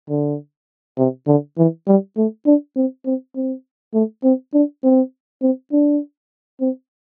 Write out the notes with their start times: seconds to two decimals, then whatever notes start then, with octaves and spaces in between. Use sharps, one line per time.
0.09 D3
0.98 C3
1.27 D3
1.58 E3
1.87 G3
2.17 A3
2.46 D4
2.77 C4
3.06 C4
3.35 C4
3.94 A3
4.24 C4
4.54 D4
4.84 C4
5.42 C4
5.72 D4
6.61 C4